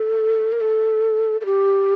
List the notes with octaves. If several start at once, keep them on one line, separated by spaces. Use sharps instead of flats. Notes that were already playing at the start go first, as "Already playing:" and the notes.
Already playing: A4
A#4
A4
A4
G4